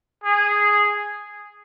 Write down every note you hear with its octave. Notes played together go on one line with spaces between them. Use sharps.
G#4